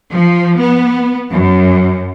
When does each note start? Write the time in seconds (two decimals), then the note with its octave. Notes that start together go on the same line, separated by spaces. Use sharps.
0.12 F3
0.60 B3
1.32 F#2